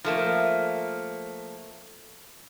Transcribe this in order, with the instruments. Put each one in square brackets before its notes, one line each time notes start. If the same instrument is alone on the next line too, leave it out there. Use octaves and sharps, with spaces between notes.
[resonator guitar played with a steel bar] F3 A3 A#3